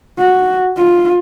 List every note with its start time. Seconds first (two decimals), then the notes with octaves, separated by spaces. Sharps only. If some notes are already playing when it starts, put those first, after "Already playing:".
0.19 F#4
0.77 F4